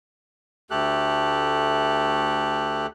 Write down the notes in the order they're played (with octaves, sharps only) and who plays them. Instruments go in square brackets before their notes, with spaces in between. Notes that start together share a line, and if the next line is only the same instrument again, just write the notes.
[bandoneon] D2 A3 G4 A4 F#6